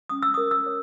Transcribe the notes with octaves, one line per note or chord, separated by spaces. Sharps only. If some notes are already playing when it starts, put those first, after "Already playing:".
C#4 D#6
E6
A#4 D#6
E6
C#5